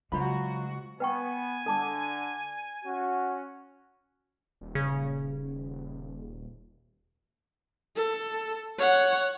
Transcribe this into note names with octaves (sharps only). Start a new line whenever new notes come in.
C#3 F#3 G#3 F4 F#4 C5 B5
B3 B4 G5 G#5 C#6
D3 A4 A5 D6
C#4 F#4
D#1
C#3
A4
C#5 F#5